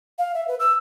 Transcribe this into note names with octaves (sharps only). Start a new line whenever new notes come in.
F5
E5
B4
E6